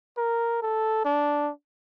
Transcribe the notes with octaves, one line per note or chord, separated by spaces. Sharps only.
A#4
A4
D4